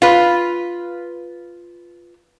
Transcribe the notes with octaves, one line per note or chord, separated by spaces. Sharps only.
F4 B4